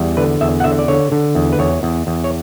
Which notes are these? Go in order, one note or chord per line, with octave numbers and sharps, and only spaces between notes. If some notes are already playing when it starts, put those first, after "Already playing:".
Already playing: E2 G3
D3 B4
E2 E5
F#5
D3 E5
D5
D3 C#5
D3
E2
B4
E2 C#5
E2
E2
C#5